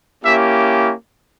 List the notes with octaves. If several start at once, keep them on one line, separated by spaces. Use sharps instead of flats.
A#3 C#4 E4 G4 E5